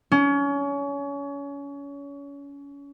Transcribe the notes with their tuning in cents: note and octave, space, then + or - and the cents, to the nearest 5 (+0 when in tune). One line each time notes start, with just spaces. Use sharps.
C#4 +30